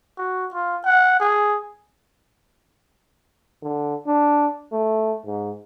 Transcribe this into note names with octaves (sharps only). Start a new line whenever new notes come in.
F#4
F4
F#5
G#4
D3
D4
A3
G#2